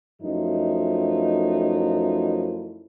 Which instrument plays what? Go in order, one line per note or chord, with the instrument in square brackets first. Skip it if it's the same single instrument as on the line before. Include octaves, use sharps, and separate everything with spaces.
[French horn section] F#2 F3 A3 D#4 E4